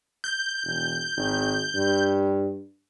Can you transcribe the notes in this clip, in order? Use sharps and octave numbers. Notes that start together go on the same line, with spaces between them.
G6
E1
G#1
G2